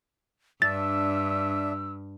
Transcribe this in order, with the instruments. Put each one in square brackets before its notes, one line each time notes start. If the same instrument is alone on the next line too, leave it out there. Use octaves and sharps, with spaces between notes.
[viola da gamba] G2 [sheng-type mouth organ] D4 E5 [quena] E6 [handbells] A6